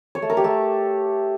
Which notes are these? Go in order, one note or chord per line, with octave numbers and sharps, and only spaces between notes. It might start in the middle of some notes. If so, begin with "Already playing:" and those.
C#5
A3
A#4
G4
A3